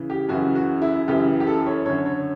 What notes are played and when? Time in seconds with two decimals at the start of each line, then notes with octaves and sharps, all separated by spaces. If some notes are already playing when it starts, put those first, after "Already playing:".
Already playing: C#3 E3
0.10 G4
0.29 F#2 C#3 E3 F#4
0.55 F#4
0.82 E4
1.08 F#2 C#3 E3 G4
1.40 G4
1.47 A4
1.66 C#5
1.86 F#2 D3 C#5
2.06 C#5